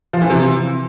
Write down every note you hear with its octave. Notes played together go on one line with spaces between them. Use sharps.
F3
E3
C3